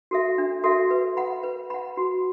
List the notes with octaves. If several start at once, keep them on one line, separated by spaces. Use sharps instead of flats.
F#4 A4 E5
D4
F#4 A4 E5
B4
F#5 B5
B4
F#5 B5
F#4